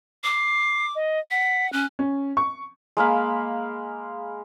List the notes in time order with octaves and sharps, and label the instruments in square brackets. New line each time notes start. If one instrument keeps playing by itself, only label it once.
[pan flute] D6 [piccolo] C7
[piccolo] D#5
[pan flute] F#5 [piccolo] B6
[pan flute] C#4 [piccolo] F#6
[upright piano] C#4
C#6
[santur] G#3 A#3 F5 B5